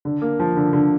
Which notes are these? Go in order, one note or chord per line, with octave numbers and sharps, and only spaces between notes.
D3
A#3
F3
D3
D3